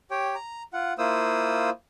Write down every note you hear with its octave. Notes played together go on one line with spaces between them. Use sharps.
G4 C#5 G5
A#5
F4 F#5
A#3 E4 F4 C5 D#6 E6